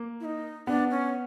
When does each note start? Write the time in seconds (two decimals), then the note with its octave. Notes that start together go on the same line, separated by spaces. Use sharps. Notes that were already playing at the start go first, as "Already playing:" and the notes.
Already playing: A#3
0.20 E4
0.25 D#4
0.67 B3 D4
0.91 C#4